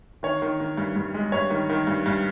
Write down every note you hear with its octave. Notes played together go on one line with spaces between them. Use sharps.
D#3 C#5
D#3
D#3
G2
G2
G#3
G2 C#5
D#3
D#3
G2
G2